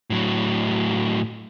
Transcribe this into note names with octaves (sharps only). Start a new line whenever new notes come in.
A2 F#3